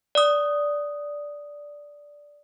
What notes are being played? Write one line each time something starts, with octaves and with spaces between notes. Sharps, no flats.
D5 D#6